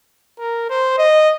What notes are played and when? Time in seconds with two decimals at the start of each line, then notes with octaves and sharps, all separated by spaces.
0.40 A#4
0.70 C5
0.98 D#5